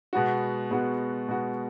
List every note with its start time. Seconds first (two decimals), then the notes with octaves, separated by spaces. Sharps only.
0.13 B2 G#3 B3 F#4
0.71 B2 G#3 B3 F#4
1.28 B2 G#3 B3 F#4